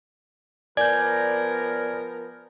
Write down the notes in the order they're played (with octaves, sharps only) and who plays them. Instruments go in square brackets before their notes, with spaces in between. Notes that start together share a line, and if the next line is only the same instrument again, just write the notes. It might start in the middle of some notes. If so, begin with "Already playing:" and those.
[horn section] F3 B3 A#4 [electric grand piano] D5 [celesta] G#5 [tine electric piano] G6 G#6